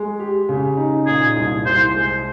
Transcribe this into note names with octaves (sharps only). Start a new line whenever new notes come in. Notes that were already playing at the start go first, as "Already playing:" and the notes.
Already playing: G#3
G4
C#3
D#4
A#2 G#4
C2
C2 C5
G#3